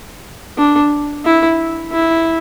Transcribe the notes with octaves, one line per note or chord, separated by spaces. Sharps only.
D4
E4
E4